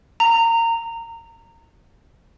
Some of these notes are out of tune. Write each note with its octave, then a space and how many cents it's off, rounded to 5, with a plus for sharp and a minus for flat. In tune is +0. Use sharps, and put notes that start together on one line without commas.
A#5 -20